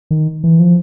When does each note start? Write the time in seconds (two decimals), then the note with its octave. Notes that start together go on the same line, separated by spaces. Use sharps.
0.11 D#3
0.44 E3
0.60 F3